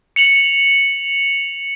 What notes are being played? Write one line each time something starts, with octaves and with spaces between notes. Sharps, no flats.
C#7 F7 F#7